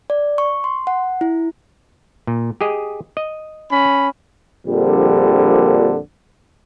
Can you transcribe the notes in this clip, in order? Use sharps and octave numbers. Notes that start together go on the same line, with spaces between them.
D5
C#6
C6
F#5
E4
A#2
G4 G#4 D#5
D#5
C#4 B5
A#1 F2 A#2 D3 G3